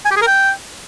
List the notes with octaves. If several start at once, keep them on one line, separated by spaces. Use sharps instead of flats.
G#5
G4
G#4
A#4
G5